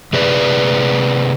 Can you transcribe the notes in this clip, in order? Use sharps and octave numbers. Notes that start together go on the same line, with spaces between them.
C3 G#4 B4 D5